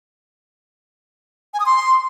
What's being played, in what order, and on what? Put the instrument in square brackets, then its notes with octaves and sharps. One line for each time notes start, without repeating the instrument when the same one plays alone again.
[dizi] G#5
D#6
C6